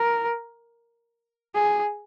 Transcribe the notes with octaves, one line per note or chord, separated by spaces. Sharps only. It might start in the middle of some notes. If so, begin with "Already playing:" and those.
Already playing: A#4
G#4